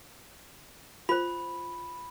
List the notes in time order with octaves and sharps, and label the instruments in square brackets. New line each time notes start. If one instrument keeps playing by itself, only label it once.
[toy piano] F4 C5 [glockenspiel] B5